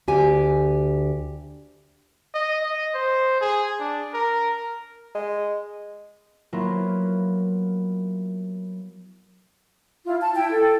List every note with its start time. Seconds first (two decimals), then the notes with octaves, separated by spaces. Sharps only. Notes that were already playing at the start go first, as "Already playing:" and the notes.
0.08 D2 G4 G#5
2.34 D#5
2.63 D#5
2.94 C5
3.41 G#4
3.79 D4
4.14 A#4
5.15 G#3
6.53 F#3 A#3 B3 E4 F4
10.05 E4 F4
10.21 A5
10.34 E4 G5
10.50 A4